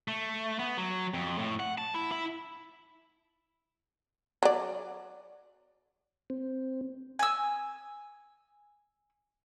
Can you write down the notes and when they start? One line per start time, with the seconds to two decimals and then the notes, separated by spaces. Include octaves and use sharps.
0.08 A3
0.59 B3
0.78 F#3
1.14 F2
1.38 A2
1.60 F#5
1.78 A5
1.94 E4
2.12 E4
4.43 F#3 D5
6.30 C4
7.19 G#5 E6